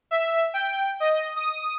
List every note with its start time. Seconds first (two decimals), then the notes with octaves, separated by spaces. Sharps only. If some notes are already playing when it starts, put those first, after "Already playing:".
0.11 E5
0.54 G5
1.00 D#5
1.36 D#6